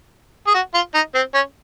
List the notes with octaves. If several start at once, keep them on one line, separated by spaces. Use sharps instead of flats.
G#4
F#4
F4
D#4
C4
C#4